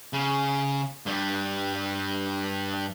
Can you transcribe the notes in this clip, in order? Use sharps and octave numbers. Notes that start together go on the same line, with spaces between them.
C#3
G2 G3